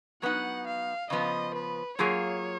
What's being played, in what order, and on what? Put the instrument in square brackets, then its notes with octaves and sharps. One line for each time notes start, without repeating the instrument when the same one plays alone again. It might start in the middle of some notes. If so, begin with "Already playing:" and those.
[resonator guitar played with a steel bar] F#3 B3 D#4 [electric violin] F#5
[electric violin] F5
[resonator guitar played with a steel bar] C#3 F3 B3 [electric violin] D#5
[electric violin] B4
[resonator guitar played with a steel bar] F#3 A#3 F4 G#4 [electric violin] C#5